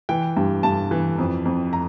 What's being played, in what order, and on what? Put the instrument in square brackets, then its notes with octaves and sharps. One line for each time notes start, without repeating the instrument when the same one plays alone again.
[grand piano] E3 G5
G2
G2 A5
E3
F2
F2
A#5